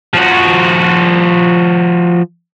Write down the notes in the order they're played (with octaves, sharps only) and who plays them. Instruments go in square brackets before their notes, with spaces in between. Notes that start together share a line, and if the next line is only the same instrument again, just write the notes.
[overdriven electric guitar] F3 F#4